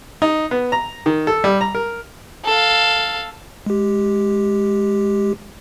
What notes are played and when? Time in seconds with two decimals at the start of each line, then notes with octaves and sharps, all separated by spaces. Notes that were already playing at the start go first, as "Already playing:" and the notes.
0.22 D#4
0.51 B3
0.72 A#5
1.06 D#3
1.27 A4
1.44 G3
1.61 A#5
1.75 A#4
2.45 A4 F5
3.66 G#3 G4